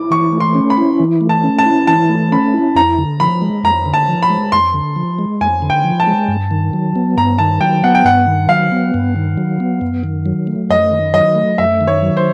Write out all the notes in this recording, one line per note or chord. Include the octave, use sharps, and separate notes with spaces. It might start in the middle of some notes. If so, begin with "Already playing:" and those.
Already playing: E4 D6
E3 C#6
A3
C6
C#4
B5
E4
E3
A3
A5
C#4
A5
E4
E3 A5
A3
C#4 B5
E4
F2 A#5
D3
F3 B5
G#3
F2 A#5
D3
A5
F3
B5
G#3
F2 C6
D3
F3
G#3
F2 G#5
D3
G5
F3
A5
G#3
G2
D#3
F#3
B3
G2 A#5
D#3 A5
F#3 G5
B3 F#5
G5
G2 F#5
D#3
F#3 F5
B3
G2
D#3
F#3
B3
F#2
D#3
F#3
A3
F#2 D#5
D#3
F#3 D#5
A3
F#2 E5
D#3
C#5
F#3
C5